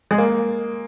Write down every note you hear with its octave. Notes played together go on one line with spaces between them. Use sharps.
G#3
A#3